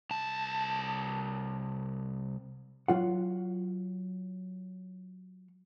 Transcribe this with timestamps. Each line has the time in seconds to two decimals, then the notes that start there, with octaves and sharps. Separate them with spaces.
0.11 C2 A5
2.88 F#3 F4 F#5